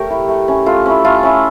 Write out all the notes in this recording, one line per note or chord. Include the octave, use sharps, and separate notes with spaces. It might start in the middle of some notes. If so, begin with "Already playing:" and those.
Already playing: A3 G4 A#4 C#5
E4
A3
C#4 E4
A3 F4
C#4 E4
A3 F4
C#4 E4